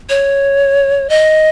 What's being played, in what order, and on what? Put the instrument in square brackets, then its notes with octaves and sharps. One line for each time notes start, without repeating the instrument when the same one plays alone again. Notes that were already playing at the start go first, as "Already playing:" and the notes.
[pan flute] C#5
D#5